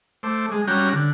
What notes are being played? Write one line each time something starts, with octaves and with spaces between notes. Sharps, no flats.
A3 C5 D6
G#3
G3 C#4 F#4 G5 A#5
D3